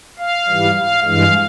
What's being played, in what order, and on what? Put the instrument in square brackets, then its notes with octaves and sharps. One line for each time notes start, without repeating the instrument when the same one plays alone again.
[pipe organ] F5
G#2 E3 G3
F5
G2 E3 G#3 F5